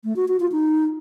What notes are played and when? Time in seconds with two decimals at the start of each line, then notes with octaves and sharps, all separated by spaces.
0.04 A3
0.16 F#4
0.28 F#4
0.40 F4
0.52 D#4